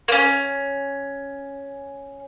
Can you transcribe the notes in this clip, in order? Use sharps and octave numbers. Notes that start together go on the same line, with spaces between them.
A#3 C#4